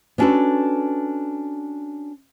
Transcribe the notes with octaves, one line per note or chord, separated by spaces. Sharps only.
B3 C#4 D4 F#4 A4 B4